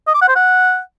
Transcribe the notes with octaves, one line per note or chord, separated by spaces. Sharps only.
D#5
D6
F#5
C5
F#5